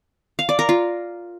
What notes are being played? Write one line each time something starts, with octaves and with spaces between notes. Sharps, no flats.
F5
D5
A#4
F4